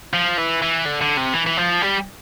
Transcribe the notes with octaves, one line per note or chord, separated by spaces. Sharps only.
F3
E3
E3
D3
D3
C3
E3
E3
F3
G3